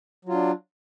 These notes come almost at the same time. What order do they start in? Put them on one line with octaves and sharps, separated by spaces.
F#3 F4 D4